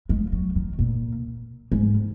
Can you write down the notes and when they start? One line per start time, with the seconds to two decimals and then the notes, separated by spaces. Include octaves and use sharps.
0.09 G#3
0.32 F#3
0.56 D#3
0.79 A#2
1.72 G#2